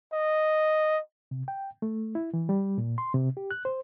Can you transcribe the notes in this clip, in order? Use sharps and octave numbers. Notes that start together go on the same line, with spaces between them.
D#5
C3
G5
A3
E4
E3
G3
A#2
C6
C3
G4
F#6
C5